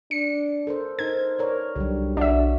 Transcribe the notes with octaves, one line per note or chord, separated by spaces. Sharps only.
D4 C#7
A4 A#4 C5
D#4 A#4 C5 G#6
A#4 C#5 D5
C2 D3 F#3 G3
B1 D4 F#4 E5